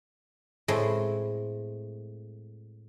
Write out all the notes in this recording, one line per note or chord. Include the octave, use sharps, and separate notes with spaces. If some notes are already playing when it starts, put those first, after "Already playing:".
A2 G#3 A3 C4